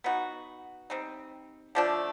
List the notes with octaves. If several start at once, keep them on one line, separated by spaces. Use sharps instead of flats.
B3 D#4 F#4
G3 C4 D#4
D3 F3 A3 D4